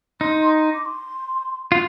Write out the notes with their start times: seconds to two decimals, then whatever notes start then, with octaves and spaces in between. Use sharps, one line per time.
0.21 D#4 C6
0.61 C6
0.73 D6
0.85 C6
1.72 F4